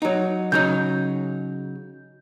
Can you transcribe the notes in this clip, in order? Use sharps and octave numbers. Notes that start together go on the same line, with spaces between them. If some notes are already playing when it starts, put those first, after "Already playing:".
F#3 D#4
C#3 F#3 D#4 G6